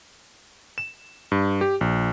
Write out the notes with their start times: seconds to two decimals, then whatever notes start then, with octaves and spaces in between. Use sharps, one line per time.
0.78 E7
1.32 G2
1.61 G4
1.81 A#1